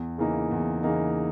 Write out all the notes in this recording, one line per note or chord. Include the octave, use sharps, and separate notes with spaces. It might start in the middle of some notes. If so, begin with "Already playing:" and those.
Already playing: E2
C#3 E3 A#3 D#4
E2
C#3 E3 A#3 D#4